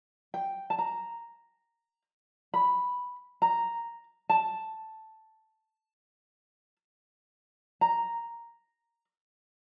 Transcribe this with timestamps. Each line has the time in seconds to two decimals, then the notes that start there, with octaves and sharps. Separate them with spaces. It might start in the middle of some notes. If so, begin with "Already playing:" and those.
0.34 G5
0.70 A5
0.79 A#5
2.54 B5
3.42 A#5
4.29 A5
7.81 A#5